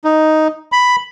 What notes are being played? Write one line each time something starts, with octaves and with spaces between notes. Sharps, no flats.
D#4
B5